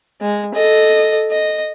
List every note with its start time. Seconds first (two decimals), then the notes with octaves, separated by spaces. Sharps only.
0.21 G#3
0.54 A4 D#5
1.31 D#5